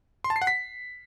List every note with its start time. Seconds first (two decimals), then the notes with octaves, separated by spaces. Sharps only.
0.24 C6
0.30 A5
0.36 C7
0.42 F#5
0.47 B6